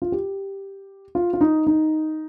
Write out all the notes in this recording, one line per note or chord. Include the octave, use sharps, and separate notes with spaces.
F4
G4
F4
F4
D#4
D#4